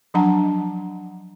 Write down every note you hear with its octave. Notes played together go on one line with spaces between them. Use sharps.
F3 F#3 D4 F#5 A5 A#5